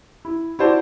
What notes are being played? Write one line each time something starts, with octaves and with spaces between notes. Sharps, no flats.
E4
E4 F#4 C5 D5 A5